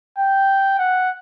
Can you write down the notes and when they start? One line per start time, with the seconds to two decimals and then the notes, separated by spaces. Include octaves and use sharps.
0.18 G5
0.78 F#5